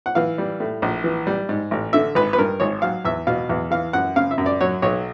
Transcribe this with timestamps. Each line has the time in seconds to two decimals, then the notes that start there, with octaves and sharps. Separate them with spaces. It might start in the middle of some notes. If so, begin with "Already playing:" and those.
0.06 F#5
0.15 E3 F5
0.38 G3
0.60 A2
0.82 A#1
1.04 E3
1.27 G3
1.49 G#2
1.71 A1
1.93 D3 E5
2.15 G#1 B4
2.33 B4
2.38 G2 A#4
2.60 G#1 C#5
2.82 F#3 F5
3.05 E2 E5
3.27 B2 F5
3.49 E2
3.71 E3 F5
3.93 F#2 F#5
4.16 C#3 F5
4.31 E5
4.38 F#2
4.46 D5
4.61 F#3 C#5
4.82 B1 C#5